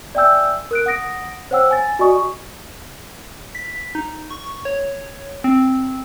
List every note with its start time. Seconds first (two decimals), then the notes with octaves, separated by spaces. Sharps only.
0.15 D5 E5 G5 G#5 E6 G6
0.71 A#4 F#6 D7
0.86 F#5 D#6 A#6 D7
1.51 C5 C#5 F#5 G5 E6
1.71 G#5 A6
1.99 F#4 D5 D#5 G#5 C#6 D#6
3.55 B6
3.95 D#4
4.30 C#6
4.65 C#5
5.44 C4